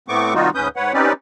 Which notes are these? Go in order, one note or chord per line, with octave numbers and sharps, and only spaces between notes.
A2 A3 B3 C4 C#6 D6
C3 D#3 G3 D#4 F4 F#4
D2 G#2 C#4 B4 D#6 G6
G#2 B4 C#5 F#5
C4 C#4 D#4 G4 B4 D5